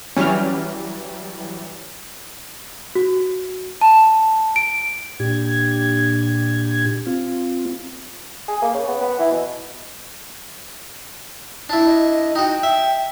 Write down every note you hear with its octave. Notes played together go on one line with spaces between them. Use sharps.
E3 F#3 G3 C#4 F6
F#4
A5
D7
A#2 D4 G4 G#6
C4 F4
G#4
A#3
C#3
B3
B3
E3
B2
D4 E4
D#5
D#4 F#4 G5
E5